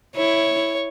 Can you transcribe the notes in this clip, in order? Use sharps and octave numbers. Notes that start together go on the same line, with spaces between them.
E4 C#5